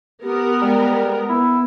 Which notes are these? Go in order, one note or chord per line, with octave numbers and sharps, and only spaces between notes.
B3 G4 A#4
G3 G#3
B3 E4